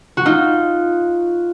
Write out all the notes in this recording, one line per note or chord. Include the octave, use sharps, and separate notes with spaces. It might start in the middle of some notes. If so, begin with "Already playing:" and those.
F#4
D#4 F4